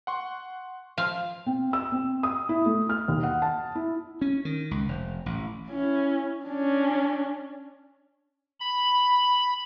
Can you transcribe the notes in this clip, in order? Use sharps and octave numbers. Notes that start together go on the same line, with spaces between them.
F#5 C6 C#6
F3 F5
C4
E6
C4
D#6
E4
A3
F6
D#2
F#5
A5
E4
C#4
D#3
C#2
F1
A1
C#4 E4
C#4 D4
B5